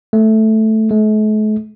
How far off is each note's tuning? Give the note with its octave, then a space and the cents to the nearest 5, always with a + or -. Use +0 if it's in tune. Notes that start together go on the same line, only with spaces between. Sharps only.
A3 -5
A3 -45